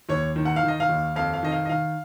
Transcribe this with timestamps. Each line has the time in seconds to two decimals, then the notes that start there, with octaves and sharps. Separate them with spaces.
0.09 D#2 C#5
0.36 D#3
0.45 F#5
0.56 F5
0.63 D#3
0.68 D#5
0.80 F5
0.89 D#2
1.16 F2 F5
1.33 F5
1.43 D#3 D#5
1.52 F5
1.65 D#5
1.69 D#3 F5